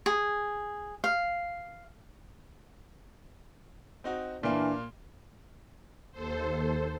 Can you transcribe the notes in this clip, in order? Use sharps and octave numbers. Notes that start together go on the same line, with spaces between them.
G#4
F5
C4 D#4 F#4
A#2 E3 A#3 D4
D#2 A4 C5